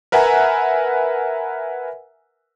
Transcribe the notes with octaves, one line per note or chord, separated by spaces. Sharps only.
A#4 B4 E5 F#5 G#5 A#5